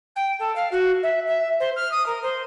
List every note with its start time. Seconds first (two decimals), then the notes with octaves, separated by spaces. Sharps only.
0.16 G5
0.39 A4
0.55 F5
0.71 F#4
1.03 E5
1.27 E5
1.60 C5
1.76 F6
1.91 D#6
2.06 A#4
2.22 C5